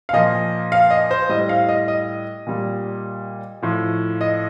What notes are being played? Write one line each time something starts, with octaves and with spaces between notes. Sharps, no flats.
F5
A#2 F3 D#5
F5
D#5
C5
A2 G3 D#5
F5
D#5
D#5
A#2 G3
A2 F3
D#5